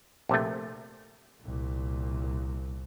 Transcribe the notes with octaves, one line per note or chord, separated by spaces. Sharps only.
A#1 C3 A3
C2 A#2